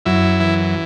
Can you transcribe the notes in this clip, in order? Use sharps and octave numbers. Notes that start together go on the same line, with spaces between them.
F#2 E4
E3